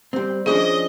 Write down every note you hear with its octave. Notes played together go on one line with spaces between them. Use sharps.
G3 C4
F3 C#4 D4 G#4 D#5